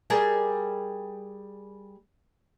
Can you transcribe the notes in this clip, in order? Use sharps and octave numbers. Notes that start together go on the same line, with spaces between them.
G3 G#4 A#4